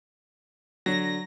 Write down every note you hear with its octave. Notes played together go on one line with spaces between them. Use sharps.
D3 F#3 A#6